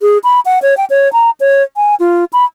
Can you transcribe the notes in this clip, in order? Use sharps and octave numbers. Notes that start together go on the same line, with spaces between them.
G#4
B5
F#5
C#5
G5
C#5
A#5
C#5
G#5
F4
B5